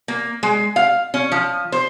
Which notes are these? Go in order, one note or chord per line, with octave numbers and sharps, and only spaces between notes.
A#3
G#3
F5
C#4
F3
C5